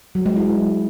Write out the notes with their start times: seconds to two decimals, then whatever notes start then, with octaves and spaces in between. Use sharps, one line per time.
0.15 F#3
0.26 G#3
0.36 E4